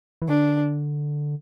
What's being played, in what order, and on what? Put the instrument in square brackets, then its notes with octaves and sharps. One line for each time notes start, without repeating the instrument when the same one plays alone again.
[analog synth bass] E3
[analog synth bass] D3 [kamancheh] D4